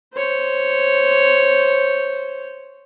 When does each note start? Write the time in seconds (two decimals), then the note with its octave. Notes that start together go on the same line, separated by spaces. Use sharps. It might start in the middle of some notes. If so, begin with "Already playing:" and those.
0.14 C5 C#5